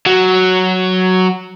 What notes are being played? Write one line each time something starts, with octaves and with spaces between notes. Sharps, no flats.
F#3